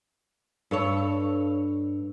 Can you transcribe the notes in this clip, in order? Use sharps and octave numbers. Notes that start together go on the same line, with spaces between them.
G2 A4 C#5